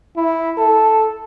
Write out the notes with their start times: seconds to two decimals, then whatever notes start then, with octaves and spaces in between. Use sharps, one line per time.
0.17 E4
0.58 A4